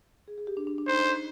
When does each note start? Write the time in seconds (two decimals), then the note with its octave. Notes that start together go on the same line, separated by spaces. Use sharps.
0.28 G#4
0.38 G#4
0.47 G4
0.57 D4
0.67 D4
0.78 D4
0.87 D#4 C5